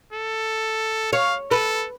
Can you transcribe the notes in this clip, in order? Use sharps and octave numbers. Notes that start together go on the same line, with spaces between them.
A4
C#5 F5
A4 B4